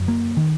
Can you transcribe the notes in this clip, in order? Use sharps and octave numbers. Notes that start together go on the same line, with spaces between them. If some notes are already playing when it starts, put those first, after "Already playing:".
Already playing: F#2 D3
A#3
D#3